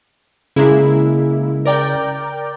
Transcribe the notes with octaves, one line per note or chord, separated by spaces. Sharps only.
C#3 G#3 A#3 E4
A#4 D5 G5